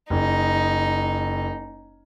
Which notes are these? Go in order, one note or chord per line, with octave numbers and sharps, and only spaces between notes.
F#1 D#4